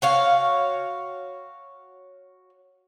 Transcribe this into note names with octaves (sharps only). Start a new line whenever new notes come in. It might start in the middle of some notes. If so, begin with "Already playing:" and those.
F#4 C#5 F5